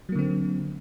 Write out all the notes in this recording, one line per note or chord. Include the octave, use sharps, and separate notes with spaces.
D3 F#3 A#3 C4